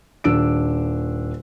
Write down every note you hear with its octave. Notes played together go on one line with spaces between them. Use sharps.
D#1 D4 E6 D7